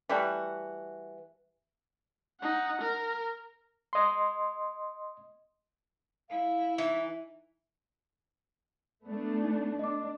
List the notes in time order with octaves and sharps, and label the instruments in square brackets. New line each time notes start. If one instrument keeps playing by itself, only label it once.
[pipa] E3 G3 A3 F#4
[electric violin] D#4 F#5
A#4
[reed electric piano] D#5 C6
[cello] E4 [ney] F5
[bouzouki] E3 [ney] D#4 [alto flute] E5
[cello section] A3 B3 D4
[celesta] D#4
[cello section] D4 [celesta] D#5 D6